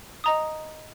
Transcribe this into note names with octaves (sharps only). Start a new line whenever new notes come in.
D#5 A#5 D#6